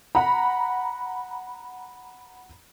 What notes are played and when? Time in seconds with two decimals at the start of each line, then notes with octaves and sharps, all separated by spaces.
0.15 F#5 A#5 B5